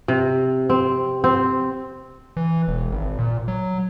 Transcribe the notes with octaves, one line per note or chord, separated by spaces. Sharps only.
C3
C4
C4
E3
E1
G#1
A#2
F#3